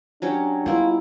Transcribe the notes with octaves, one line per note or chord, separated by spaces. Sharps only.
F#3 C#4 D4 G4
B2 G3 A#3 E4 F4